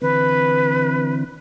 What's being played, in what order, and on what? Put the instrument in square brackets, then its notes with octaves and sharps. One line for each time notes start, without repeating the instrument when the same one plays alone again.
[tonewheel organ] D3 E3 C4 [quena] B4